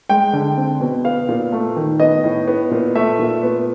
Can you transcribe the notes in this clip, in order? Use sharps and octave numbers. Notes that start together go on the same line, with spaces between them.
G#3 G5
D3
C4
B2
B3 F5
A#2
A3
D#3
B3 D#5
A2
B3
A#2
A3 E5
A#2
B3